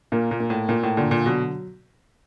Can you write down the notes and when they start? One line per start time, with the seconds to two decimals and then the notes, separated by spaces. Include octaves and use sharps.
0.12 A#2 A#3
0.31 A#2
0.40 A#3
0.50 A2
0.69 A#2 A#3
0.83 A2
0.97 A#2 D3
1.11 A#2
1.26 B2 F#3